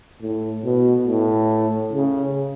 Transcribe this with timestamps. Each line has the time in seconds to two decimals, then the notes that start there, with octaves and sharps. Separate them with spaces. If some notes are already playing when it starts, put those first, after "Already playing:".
0.22 A2
0.64 B2
1.07 A2
1.93 C#3